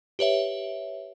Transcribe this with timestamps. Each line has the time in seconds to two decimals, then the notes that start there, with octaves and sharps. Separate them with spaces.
0.19 G4 B4 C#5 E5